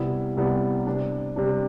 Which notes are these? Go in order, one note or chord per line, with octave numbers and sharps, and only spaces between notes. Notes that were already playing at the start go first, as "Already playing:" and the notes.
Already playing: C2 C3 G3 B3 E4
C2 C3 G3 B3 E4
C3 G3 D4
C3 G3 D4